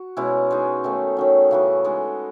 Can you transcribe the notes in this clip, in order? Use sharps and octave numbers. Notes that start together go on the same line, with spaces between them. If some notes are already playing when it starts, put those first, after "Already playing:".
Already playing: F#4
B2 G#3 C#4 E4
G#3 B3 D#4
D#3 A3 C#4
D#3 F#3 C#4
C#3 E3 B3 F#4
G#3 D#4 A4